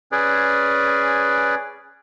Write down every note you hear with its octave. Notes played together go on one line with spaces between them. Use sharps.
C#4 G#4 B4 D5